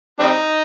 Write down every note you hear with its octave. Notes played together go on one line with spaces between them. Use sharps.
G3 C4 D#4